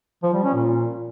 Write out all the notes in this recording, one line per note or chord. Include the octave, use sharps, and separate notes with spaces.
F3
G3
C#4
A#2